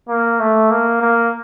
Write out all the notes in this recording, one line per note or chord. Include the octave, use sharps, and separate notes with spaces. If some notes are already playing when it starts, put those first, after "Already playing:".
A#3
A3
A#3
A#3